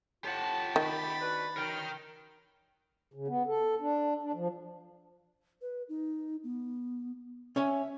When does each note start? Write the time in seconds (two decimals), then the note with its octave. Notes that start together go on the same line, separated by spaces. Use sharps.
0.24 A2 F4 G4 F#5 A5
0.76 D#3 B5 A6
1.21 D4 F#4 B4
1.57 F#2 D#4 A#4 G5 F6
3.14 C#3
3.28 B3
3.47 A4
3.80 D4
4.23 D4
4.34 F3
5.62 B4
5.89 D#4
6.44 B3
7.56 C#4 C#5 E5 G#5